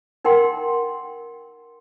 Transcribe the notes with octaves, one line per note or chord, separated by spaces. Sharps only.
D#4 A#4 F#5 G5 C6